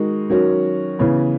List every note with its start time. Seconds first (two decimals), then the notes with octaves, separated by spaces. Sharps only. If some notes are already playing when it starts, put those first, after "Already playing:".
Already playing: D#3 G#3 D#4 F#4
0.30 D#3 F#3 C#4 F#4
0.99 C#3 E3 B3